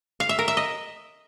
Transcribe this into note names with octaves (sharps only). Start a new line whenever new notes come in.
F5
E5
A#4
E5
D#5